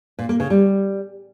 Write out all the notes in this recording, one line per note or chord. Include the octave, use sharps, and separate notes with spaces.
A#2
A#3
C#3
G3